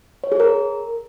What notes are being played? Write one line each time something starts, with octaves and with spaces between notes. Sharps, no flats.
C#5
G#4
A#4